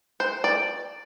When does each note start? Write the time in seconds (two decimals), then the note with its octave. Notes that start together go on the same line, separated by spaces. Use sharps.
0.20 C5
0.44 D5